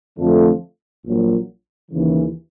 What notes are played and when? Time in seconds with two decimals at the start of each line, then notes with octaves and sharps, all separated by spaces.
0.17 F2 D3 F3 A3
1.04 A#1 A#2 F#3
1.91 D#2 C#3 E3